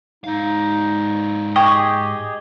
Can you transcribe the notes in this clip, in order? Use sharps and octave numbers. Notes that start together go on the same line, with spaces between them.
G#2 D#4 F5
G4 G#4 D#5 G5 C#6 G#6